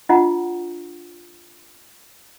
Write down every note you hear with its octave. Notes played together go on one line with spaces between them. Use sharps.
D4 F4 D#5 F#5 A#5